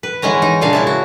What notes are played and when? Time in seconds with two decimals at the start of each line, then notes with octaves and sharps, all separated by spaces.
0.03 B4
0.22 E3 G#3 B3 C#4 A#5
0.42 D#4
0.61 A#2 C#3 G#3 D4 F5 A5
0.73 C#3 E4 A5
0.87 F#4